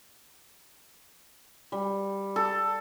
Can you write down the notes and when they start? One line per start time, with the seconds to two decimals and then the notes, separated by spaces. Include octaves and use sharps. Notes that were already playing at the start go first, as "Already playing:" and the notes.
1.72 G3
2.36 A4